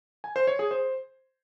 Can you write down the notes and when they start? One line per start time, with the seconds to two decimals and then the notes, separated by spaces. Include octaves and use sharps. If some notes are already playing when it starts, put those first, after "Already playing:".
0.24 G#5
0.36 C5
0.47 C#5
0.59 G#4
0.71 C5